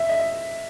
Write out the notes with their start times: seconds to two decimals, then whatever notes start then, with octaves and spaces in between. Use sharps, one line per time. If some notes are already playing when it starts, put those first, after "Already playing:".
Already playing: E5
0.09 D#5